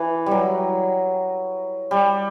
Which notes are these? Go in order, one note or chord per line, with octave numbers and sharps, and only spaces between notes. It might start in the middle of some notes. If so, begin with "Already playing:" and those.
Already playing: E3
F#3 G3
G3